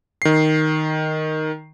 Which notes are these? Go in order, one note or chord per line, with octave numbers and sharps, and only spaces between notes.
D#3 C7